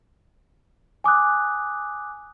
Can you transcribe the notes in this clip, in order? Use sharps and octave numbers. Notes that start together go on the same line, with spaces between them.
G#5 D6 D#6 F#6